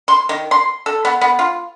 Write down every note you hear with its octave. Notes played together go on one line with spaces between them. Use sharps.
C6
D#3
C6
A4
B3
B3
F4